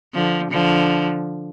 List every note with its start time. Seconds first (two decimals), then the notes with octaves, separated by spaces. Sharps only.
0.14 D3 F3
0.51 D3 F3